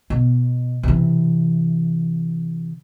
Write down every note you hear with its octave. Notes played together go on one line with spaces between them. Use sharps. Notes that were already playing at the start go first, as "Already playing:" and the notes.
B2
C3 E3